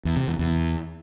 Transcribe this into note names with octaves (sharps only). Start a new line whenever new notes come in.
E2
C3
E2
E2